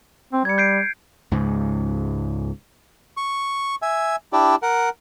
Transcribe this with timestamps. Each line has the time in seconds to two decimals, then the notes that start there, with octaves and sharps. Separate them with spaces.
0.33 C4
0.45 G3 G#6 C#7
0.58 G6 C7 D7
1.32 C#2 G#2
3.17 C#6
3.82 E5 G#5
4.33 D4 E4 G4 D5
4.63 A#4 F#5